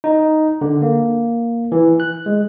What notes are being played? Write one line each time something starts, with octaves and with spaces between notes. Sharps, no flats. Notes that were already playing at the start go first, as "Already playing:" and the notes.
D#4
D3
A#3
E3
F#6
G#3